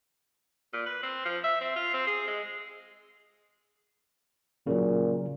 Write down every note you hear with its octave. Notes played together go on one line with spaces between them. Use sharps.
A#2
B4
C4
F3
E5
C4
F4
C4
G#4
G#3
A#2 C#3 F#3